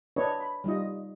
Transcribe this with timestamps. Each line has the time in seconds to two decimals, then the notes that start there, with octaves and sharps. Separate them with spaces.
0.16 D4 B4 C#5 D#5
0.40 B5
0.64 G3 D#4 F4 D#5